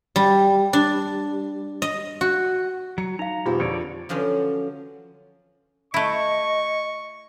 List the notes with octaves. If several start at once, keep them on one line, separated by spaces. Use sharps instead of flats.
G3
D4
D#5
F#4
F#3 C#7
D#4 F5 A#5
E1 C4 F4 G4 G#4
F2 D3 C#5 D5
D3 F3 F#3 C#4 F4
A3 E4 D#5 C#6